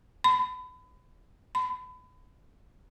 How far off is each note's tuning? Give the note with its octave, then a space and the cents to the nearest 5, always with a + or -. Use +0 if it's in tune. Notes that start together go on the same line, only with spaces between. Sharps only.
B5 +30
B5 +30